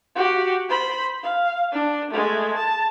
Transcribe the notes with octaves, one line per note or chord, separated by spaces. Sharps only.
F#4 G4
C5 B5
F5
D4
G#3 A3
A5